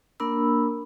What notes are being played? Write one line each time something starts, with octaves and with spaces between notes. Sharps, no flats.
A#3 D4 A#4 B5 E6